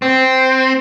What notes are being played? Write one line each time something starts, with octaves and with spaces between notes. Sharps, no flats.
C4